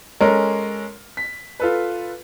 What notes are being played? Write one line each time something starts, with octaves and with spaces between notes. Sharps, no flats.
G#3 C#4 A4 A#4
B6
F4 A4 B4